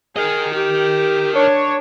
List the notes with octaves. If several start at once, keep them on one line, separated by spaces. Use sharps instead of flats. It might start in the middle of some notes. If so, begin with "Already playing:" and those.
G#4 A#4 D#5
G4
D4 C#5